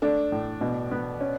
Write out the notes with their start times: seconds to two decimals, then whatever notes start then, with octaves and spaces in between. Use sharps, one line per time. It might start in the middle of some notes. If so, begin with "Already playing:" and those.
0.02 A3 D4
0.32 A2
0.61 B2
0.91 B3
1.20 C#4